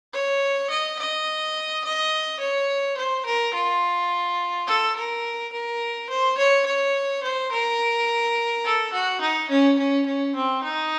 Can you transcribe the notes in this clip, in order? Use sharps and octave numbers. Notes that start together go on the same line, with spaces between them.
C#5
D#5
D#5
D#5
C#5
C5
A#4
F4
A4
A#4
A#4
C5
C#5
C#5
C5
A#4
A4
F#4
D#4
C#4
C#4
C#4
C4
D#4